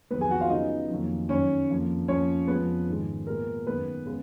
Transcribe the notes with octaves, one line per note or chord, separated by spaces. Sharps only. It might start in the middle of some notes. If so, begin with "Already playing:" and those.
F2 D#3 F#3 B3 B4
G#4 G#5
F#4 F#5
F4 F5
C#3 F#3 B3 D#4 D#5
F2 D#3 F#3 A#3
F#2 D#3 F#3 C#4 C#5
F2 F3 A#3
F2 F3 A#3 C#4 C#5
F2 F3 G#3 B3 B4
G#2 D#3 G#3
A#2 G#3 B3 A#4
F#2 D#3 G#3 B3 B4
C#3 G#3 B3